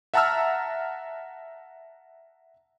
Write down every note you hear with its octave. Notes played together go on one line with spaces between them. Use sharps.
E5 F#5 A5 A#5 E6 F6